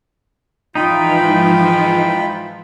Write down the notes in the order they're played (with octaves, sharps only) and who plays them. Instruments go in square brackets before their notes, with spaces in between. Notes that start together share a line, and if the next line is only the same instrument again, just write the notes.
[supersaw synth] G#2 E3 F3 [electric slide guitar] D#4 [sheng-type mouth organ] F4 G5 B5